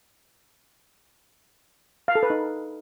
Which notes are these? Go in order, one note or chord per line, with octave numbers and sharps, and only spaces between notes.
F5
A4
B4
D#4